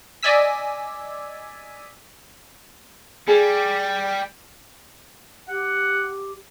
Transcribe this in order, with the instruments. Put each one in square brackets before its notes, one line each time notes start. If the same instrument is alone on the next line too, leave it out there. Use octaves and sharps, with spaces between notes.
[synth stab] D5 D#5 G#5 E6 B6
[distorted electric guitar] G3 [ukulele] G#4
[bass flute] G4 [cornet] F#5